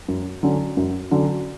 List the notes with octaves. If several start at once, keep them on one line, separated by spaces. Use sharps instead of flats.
F#2
D3 F#3 C#4 F#4
F#2
D3 F#3 C#4 F#4